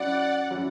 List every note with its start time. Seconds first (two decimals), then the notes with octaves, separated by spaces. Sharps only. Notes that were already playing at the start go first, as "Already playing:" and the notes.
Already playing: F#3 C#4 E4 D5 F#5
0.51 F#3 C#4 E4